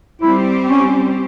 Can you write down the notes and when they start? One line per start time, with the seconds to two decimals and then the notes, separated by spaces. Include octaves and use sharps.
0.22 G3 C4 E4 G4 C5
0.69 C#4